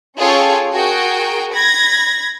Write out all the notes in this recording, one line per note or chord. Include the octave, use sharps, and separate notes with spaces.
C#4 F4 G#4 A4 C#5 G5
F#4 G#4 A#4 G5
B5 G#6 A#6